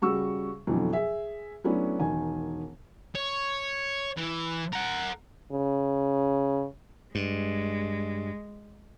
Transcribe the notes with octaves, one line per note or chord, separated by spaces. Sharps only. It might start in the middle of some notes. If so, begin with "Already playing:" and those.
C#3 G3 F#4 C#6 E6
F2 B2 D3 E3 F#3
G#4 E5
F#3 A3 B3 C#4 D4 E4
E1 D#3 G#5
C#5
E3
A#4 F#5
C#3
G2 G#3